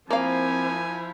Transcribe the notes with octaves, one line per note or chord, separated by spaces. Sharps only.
F3 A#3 C4 E4 F5 G#5